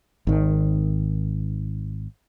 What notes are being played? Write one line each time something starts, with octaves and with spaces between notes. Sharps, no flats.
G#1 D#3